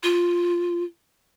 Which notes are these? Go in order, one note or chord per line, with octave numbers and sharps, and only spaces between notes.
F4